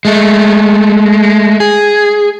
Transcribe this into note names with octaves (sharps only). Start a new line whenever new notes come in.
G#3 A3
G#4